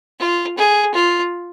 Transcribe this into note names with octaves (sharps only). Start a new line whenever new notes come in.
F4
G#4
F4